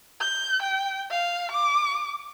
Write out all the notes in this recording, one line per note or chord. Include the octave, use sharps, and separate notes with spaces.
G6
G5
F5
D6